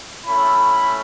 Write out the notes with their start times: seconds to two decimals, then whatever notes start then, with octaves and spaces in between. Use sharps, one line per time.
0.24 A3 C#4 E4 B5